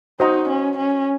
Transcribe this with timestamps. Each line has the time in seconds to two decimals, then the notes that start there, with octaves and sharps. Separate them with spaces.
0.20 D#4 F#4 C5 D#5 F#5 A#5
0.48 C#4
0.77 C#4